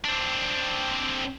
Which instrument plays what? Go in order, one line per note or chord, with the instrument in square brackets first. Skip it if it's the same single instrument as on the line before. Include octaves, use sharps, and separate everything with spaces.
[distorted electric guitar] C4 D4